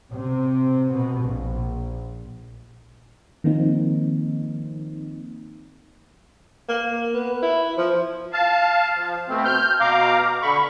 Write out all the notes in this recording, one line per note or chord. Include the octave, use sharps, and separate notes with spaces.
C3
B2
A#1
D#3 F3 A#3 C4 D#4
A#3
B3
E4
F3
F5 A5
F3
B2 A3 C4
F6 G6
B2 F5 A#5 D6
D3 B5 C#6